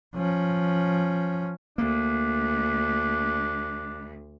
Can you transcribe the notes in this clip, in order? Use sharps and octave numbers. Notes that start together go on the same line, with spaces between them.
F3 C#4
D2 A#3 D4